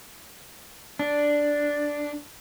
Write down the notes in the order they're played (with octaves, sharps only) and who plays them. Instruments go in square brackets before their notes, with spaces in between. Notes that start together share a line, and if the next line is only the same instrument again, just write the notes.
[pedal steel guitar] D4